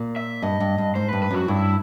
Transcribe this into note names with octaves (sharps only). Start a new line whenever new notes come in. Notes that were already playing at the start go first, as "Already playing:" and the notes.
Already playing: A#2
E5
G2 D#5
G2
G2
G#2 C5
G2 B4
B4
F#2 F#4
G2 E4